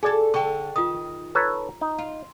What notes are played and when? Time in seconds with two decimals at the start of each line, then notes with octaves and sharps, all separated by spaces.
0.03 F#4 G#4 A4 D5 G#5
0.34 D3 A4 G5 C#6
0.76 D#3 F4 D#6
1.35 A4 B4 C#5 A#5
1.81 D#4
1.98 F4